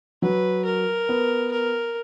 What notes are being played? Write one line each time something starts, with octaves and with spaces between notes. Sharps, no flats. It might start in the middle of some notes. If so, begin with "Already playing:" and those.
F#3 B4
A#4
B3
A#4